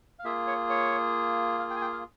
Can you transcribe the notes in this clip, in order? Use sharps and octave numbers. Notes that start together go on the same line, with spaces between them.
F5
A#3 F4 G#4 E5
C#5
C#5
F5
G5
G#5
G5
F5